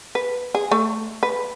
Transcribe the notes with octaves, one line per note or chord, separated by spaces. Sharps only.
B4
G#4
A3
B4